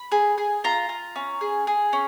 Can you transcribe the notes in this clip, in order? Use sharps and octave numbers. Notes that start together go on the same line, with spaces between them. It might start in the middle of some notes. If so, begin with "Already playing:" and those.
Already playing: B5
G#4
G#4
F4 A#5
F4
C#4
G#4
G#4
C#4